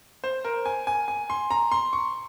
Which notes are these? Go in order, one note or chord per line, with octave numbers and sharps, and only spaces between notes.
C5
A#4
G#5
G#5
G#5
C6
A#5
C6
C#6